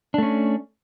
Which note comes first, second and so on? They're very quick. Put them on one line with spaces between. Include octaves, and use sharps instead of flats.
D4 A3 C#4